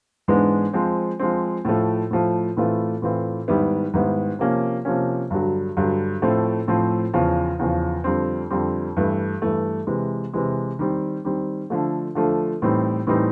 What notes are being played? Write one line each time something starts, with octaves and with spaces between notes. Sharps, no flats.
G#2 E3 G#3 B3 D4
F3 G#3 C4
F3 G#3 C4
A2 F3 A3
A2 F3 A3
A2 E3 A3 C4 F4
A2 E3 A3 C4 F4
G#2 D#3 G3 B3 E4
G#2 D#3 G3 B3 E4
C3 F3 A#3 C#4
C3 F3 A#3 C#4
G2 D3 F#3
G2 D3 F#3
A2 F3 A3 C4
A2 F3 A3 C4
E2 C#3 F3
E2 C#3 F3
F2 D3 G3 C4
F2 D3 G3 C4
G2 E3 A3
G2 E3 A3
C3 E3 G#3
C3 E3 G#3
D#3 G3 C4
D#3 G3 C4
D3 F3 A3
D3 F3 A3
A2 E3 G3 C4 D#4
A2 E3 G3 C4 D#4